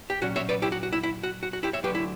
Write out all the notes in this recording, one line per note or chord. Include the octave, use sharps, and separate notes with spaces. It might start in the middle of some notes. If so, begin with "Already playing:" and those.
G4
A#2 F#3 C#4 F#4
C#5 E5
B4 D5
E4 G4
F#4
F#4
E4
E4
F#4
F#4
F#4
E4 G4
C#5 E5
D2 D3 F#3 G4 B4
E4